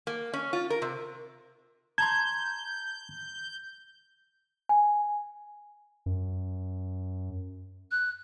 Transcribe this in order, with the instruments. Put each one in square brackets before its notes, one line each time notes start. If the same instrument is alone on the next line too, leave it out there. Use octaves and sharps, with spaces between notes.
[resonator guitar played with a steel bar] A#3
C#4
F4
A#4
C3
[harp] A5 A#5 C6 [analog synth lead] G6 [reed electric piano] G#6
[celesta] G#5
[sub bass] F#2
[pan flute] F#6